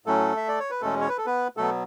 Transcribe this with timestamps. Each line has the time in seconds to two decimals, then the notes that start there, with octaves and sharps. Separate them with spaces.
0.06 A2 F#3 A3 C#4 A4
0.37 E5
0.48 D5
0.60 C#5
0.71 B4
0.82 E2 B2 G#3 A3 C#4 A4
1.01 C#5
1.09 B4
1.18 A4
1.26 B3 B4
1.57 B2 F#3 A3 B3 A4